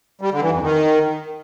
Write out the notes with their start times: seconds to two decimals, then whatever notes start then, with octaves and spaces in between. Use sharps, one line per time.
0.21 G3
0.31 D3
0.41 E3
0.52 F2
0.62 D#3